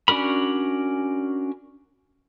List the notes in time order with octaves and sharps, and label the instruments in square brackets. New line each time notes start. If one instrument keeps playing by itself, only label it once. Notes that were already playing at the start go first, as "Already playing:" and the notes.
[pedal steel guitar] C#4 D4 F#4 A#4 B5